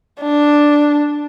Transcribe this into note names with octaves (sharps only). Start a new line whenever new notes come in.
D4